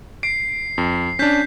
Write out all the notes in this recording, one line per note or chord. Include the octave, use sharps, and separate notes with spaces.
C7 D7
F2
C#4 D4 G6 B6